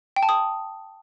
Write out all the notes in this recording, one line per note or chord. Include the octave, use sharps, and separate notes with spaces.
G5
A5
D#6